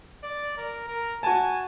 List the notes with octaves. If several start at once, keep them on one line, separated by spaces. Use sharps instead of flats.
D5
A#4
A#4
F#4 G#5 A5